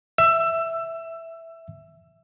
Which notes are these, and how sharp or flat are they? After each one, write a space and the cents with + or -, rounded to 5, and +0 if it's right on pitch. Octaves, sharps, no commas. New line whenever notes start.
E5 +0 E6 +20